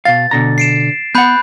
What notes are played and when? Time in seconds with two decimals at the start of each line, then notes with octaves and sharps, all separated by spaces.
0.05 B2 F5 A6
0.31 B2 D3 A#5
0.58 C7 D7 E7
1.15 B3 F#5 B5 F#6 G6